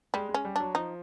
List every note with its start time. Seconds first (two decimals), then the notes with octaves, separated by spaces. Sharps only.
0.14 G3 G#3
0.29 G#3
0.34 C#4
0.45 G3
0.56 F#3 D4
0.75 F3 D#4